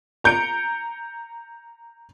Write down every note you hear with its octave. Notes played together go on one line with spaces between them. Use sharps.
A#5 G6 C#7 D7